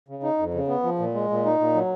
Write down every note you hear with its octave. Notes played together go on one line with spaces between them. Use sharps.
C#3
D#4
F2
C#3
B3
F3
A#2
G#3
A#2
D#4
A#2
F#3